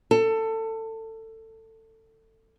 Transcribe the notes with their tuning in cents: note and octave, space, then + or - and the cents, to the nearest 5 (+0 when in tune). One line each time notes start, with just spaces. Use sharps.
A4 +20